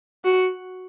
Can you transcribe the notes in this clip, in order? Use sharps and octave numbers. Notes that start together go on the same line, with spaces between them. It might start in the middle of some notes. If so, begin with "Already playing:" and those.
F#4